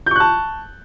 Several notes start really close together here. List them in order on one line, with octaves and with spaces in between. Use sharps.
G6 C#6 F#6 A5